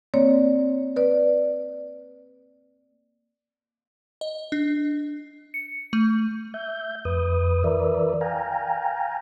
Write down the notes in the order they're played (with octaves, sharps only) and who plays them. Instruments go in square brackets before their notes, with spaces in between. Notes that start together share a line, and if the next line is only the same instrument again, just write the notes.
[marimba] A#3 C4 C#5 D5
B4 D5
[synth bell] D#5
D4
C#7
A3
[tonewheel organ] E5 G6
F2 B4 D#6
E3 A#4 B4 D5 E5
F5 G5 G#5 A#5